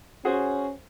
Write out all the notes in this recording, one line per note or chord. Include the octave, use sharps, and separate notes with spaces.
C#4 F#4 G#4 C5